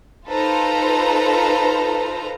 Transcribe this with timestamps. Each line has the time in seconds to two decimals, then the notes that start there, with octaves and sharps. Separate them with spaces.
0.27 D#4 F4 A4 B4 C5 A#5